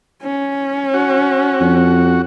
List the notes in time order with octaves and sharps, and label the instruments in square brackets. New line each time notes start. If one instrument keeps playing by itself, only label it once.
[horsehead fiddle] C#4
[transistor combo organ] F#4
[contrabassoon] F2